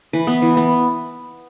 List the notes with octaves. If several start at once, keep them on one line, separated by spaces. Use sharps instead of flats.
E3 B4
B3
E3
B3